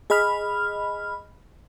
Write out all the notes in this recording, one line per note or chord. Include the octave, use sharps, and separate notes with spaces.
G#4 D#5 B5 F6